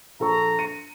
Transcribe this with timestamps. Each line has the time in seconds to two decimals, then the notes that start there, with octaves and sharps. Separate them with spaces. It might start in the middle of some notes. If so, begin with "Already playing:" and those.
0.20 A#1 A4 A#5 C#6
0.59 C#7 D#7